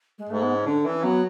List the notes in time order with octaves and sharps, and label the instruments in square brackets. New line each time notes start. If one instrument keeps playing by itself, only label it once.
[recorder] G#3
[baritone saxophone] G#2 [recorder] A3
[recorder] B3
C#4
[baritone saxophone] D3 [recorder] D4
[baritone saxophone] E3 [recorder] C#4
[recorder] C#4
[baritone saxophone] F#3 [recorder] B3